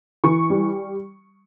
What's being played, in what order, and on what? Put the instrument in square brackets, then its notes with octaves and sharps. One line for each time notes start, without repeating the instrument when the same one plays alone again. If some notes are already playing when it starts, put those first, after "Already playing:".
[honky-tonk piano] E3 C#6
G3